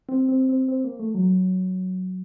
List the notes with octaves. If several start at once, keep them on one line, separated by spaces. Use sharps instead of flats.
C4
C4
C4
C4
A#3
A3
F#3